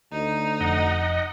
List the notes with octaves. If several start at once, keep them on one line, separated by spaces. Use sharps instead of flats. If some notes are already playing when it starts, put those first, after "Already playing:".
D2 D#4
F1 F2 D#5 F#5